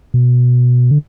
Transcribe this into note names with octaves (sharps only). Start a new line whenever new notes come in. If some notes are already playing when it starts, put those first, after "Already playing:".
B2
D3